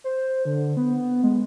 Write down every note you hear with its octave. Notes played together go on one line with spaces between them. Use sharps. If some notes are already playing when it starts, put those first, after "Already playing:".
C5
D3
B3
G#3